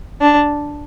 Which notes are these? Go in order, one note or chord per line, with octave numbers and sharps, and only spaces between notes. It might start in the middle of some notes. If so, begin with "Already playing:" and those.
D4